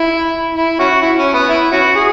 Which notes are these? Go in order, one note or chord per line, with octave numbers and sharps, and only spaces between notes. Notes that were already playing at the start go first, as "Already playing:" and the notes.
Already playing: E4
E4
C#4 F#4
E4
C#4
B3
E4
C#4 F#4
G#4